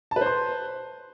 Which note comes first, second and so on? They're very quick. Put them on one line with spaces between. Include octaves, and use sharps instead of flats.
A5 B4 C5 C6